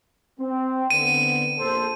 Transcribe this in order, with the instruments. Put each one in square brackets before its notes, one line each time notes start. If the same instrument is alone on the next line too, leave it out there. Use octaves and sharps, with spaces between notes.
[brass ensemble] C4
[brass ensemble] D3 B3 C4 [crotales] D#7
[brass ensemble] A#1 A4 C5